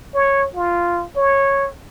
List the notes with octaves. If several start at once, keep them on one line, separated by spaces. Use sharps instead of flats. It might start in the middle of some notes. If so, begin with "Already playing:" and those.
C#5
F4
C#5